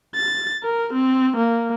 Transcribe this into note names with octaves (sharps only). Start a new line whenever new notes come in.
A6
A#4
C4
A#3